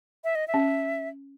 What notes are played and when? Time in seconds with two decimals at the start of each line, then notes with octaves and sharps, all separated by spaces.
0.24 E5
0.35 D#5
0.48 E5
0.54 C#4